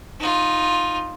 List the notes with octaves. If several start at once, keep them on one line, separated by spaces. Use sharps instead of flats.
D#4 F4